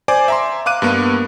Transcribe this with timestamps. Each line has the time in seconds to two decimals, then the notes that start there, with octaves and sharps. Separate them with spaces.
0.08 C5 D5 G#5 D6
0.28 E5 A#5 C6
0.66 F5 D6 F#6 D#7
0.82 G2 A#3 B3